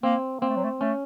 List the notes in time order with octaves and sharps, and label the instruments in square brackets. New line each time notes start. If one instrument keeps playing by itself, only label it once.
[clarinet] A#3 [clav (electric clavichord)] C4
[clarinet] A#3 [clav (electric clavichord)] C4
[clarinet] A3
F#3
A3
[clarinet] A3 [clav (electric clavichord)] C#4